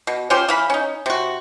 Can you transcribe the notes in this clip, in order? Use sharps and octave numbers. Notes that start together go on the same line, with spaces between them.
B2
C#4 F4 G4 C5
E3 F5 B5
C#4 D#4
C3 F#4